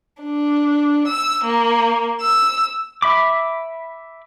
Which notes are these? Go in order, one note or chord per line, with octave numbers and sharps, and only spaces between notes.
D4
E6
A#3
E6
E5 B5 D6